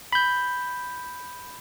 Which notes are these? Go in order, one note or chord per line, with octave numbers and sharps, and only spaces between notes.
B5 G6